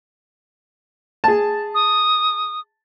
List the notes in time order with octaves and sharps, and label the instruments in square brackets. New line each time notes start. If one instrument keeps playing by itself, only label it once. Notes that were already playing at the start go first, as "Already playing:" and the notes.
[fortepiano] G#4 A5
[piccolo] D#6